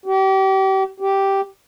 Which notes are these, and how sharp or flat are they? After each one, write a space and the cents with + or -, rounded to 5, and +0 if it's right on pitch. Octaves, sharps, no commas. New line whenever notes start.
G4 -35
G4 -5